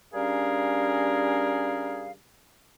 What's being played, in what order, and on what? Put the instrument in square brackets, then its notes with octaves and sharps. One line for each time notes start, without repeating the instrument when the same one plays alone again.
[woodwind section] G3 C#4 D4 G#4 A#4 F5